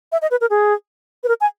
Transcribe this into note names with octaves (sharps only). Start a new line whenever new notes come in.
E5
D#5
B4
A#4
G#4
B4
A#4
G#5